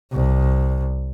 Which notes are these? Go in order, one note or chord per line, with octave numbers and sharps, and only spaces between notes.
C2